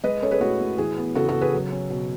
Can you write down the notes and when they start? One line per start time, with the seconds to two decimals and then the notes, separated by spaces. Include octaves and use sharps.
0.04 G#3 B4 D#5
0.22 C#4 A4 C#5
0.31 G#4 B4
0.41 A2 F#4
0.61 A2
0.78 E3 G#4
0.97 B3
1.15 C#3 F#4 A4
1.29 F#4 A4
1.35 C#3
1.41 G#4 B4
1.53 F#3
1.72 C#4
1.90 B2